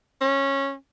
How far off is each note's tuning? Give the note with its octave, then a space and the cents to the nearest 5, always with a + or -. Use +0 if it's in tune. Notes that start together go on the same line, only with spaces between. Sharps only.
C#4 -15